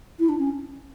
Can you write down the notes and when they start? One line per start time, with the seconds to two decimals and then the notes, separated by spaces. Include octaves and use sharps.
0.19 E4
0.29 D4
0.38 C#4